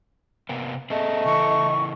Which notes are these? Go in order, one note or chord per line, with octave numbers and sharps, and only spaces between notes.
C3 A#3 B3
A3 C4 G#4 A4 D#5
C#3 E3 A4 C#6